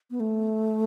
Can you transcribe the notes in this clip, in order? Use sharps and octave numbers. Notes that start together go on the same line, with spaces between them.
B3
A3